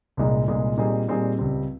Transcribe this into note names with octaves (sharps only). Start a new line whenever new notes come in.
C2 A#2 G#3 D#4 G#4
C2 A#2 G#3 D#4 G#4
A#2 G3 C4 D#4 G#4
A#2 G3 C4 D#4 G#4
C#2 C#3 G3 C4